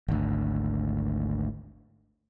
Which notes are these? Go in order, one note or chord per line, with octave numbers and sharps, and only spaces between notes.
G#1 D2